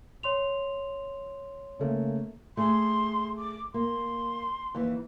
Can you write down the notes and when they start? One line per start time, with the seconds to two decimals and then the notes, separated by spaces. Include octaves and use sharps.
0.23 C#5 C6 F7
1.79 C#3 A3 A#3
2.57 A3 G#4 C6
3.38 D6
3.74 A#3 C6
4.75 D#2 E3